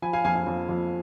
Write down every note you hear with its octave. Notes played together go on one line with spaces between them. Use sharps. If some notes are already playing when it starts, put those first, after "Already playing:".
F3 G#5 B5
F5 G#5
F2 F5 G#5
F5 G#5
F2
F2